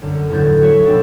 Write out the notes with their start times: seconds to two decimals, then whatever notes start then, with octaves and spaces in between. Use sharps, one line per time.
0.02 F#2 D3
0.30 E2 A2 D3 F#3 G6 A6
0.60 F#3 F#4 G#4 C#5 E5
0.85 B2 F3 C4 D4 E4 A4